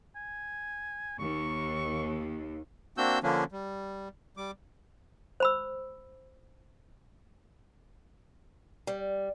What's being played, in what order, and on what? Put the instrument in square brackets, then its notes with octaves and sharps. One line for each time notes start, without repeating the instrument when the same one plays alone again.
[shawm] G#5
[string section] D#2 [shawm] C#6
[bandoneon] A#3 C4 D4 F#4 E6 G6
D3 F3 A#3 C#4 D4
G3
G3 D6
[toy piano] C5 B5 E6
[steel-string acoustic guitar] G3